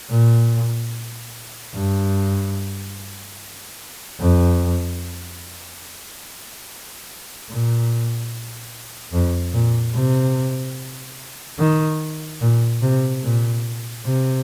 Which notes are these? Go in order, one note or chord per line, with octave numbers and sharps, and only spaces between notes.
A#2
G2
F2
A#2
F2
A#2
C3
D#3
A#2
C3
A#2
C3